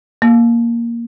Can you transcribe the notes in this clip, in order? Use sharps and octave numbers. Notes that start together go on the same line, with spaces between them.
A#3